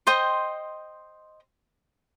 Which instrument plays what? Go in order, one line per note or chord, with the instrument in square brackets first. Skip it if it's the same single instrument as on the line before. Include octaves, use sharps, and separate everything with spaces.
[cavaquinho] C5 D#5 G5 C6